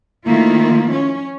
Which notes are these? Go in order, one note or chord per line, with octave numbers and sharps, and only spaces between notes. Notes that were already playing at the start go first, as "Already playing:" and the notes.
D#3 F3 A3 A#3 E4 F4
C#4